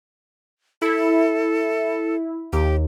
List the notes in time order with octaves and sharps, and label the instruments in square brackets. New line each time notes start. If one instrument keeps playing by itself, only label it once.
[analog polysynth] E4 [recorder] A4
[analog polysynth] D#2 [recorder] G4